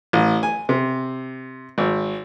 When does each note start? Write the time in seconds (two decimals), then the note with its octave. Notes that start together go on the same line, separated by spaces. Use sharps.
0.13 A1
0.43 G#5
0.69 C3
1.78 G#1